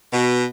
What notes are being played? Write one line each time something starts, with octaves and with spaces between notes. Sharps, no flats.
B2